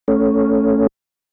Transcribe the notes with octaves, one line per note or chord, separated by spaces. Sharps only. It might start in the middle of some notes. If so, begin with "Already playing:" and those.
A3 C#4